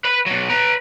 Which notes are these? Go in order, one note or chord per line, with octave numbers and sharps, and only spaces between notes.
B4 B5
B2 F#3
B4 A#5